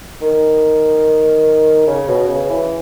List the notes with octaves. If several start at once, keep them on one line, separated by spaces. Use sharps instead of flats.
D#3
C#3
B2
C#3
E3